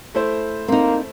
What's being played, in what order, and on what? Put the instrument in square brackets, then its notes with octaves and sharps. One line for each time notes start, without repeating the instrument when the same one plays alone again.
[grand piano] A3 E4 C5
[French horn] A#3 [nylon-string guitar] C4 D#4